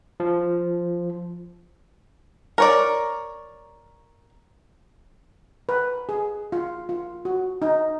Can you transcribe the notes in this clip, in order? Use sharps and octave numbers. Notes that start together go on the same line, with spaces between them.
F3
A#4 C#5 D5
B4
G#4
F4
F4
F#4
D#4